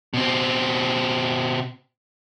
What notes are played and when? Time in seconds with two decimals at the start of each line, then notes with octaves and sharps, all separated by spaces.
0.14 B2 C4